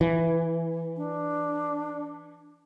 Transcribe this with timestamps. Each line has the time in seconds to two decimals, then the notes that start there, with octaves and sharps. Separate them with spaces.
0.01 E3
0.97 D4